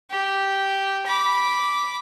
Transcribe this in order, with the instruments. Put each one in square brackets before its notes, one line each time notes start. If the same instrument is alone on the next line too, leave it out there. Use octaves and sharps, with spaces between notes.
[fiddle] G4
B5 D6